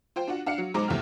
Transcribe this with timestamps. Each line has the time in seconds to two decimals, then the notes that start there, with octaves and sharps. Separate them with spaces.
0.16 F4 C5 G5
0.28 D4 F4 F#4 F#5
0.46 D4 F5 F#5 C#7
0.58 F#3
0.74 B1 G#3 D#4 C5 A#5 D6
0.88 E2 C3 A3 G4 F6